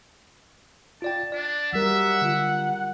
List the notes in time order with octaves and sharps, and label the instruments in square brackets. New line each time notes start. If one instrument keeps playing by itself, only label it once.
[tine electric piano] F4 D5 G5 [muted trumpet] A5
[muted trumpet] D4 [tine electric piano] D5
[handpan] F#3 G3 A#4 [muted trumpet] E5 [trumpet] F#5
[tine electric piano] D3 F4